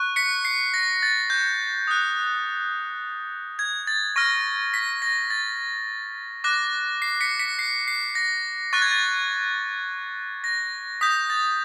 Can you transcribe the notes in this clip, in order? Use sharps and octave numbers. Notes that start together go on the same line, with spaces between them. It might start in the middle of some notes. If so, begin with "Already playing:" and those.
Already playing: C#6 F#6
B6 C#7
C7
A#6
A6
G6
D#6 F#6
G#6
A6
C#6 F6 A#6
B6
A#6
A6
D6 F#6 A#6
C7
B6 C#7
B6 C#7
C7
C7
A#6
C#6 F#6 A6
G#6
A6
A#6
D#6 G6 B6
A6